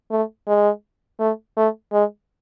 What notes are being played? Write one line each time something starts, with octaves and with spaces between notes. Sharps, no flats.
A3
G#3
A3
A3
G#3